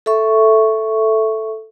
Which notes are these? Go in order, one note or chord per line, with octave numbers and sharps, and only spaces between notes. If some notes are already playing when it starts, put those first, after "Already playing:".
A4 E5 C#6